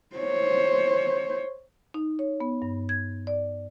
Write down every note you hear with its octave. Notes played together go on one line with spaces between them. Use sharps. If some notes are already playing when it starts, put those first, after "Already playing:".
C5 C#5
D#4
C#5
B3
G2
G#6
D5